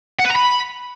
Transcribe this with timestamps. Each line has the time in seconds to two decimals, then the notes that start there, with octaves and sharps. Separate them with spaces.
0.19 F#5
0.25 B4
0.30 A#5
0.35 B5